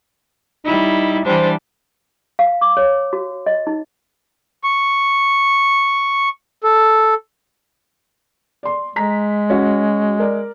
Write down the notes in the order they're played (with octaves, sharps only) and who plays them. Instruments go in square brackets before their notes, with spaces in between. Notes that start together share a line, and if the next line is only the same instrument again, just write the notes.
[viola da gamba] G3 E4 [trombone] D#4
[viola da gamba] E3 G3 D4 [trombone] C5
[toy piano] F5
D6
C#5
F#4
D#5
D#4
[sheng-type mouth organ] C#6
A4
[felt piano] D5 C6
[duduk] G#3 [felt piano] A#5 B6
[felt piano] C#4 F#4
A#4 D5